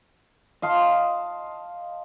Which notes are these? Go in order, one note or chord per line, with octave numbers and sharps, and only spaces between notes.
D#5 F5 A5 C6